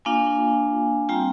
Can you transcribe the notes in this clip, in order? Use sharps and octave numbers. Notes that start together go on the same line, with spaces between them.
A#3 D4 F4 F5 G#5
G3 C4 F4 G5 A#5